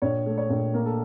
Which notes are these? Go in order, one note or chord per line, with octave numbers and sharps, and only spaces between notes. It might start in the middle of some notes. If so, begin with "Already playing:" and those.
A#1 C#5
A3
C#5
A#1
A#3 A#4
A4